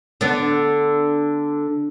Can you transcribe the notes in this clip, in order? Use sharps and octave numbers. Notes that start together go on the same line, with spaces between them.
D3 B3 D4